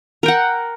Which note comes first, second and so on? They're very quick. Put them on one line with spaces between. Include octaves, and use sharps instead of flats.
A#4 G5 F#5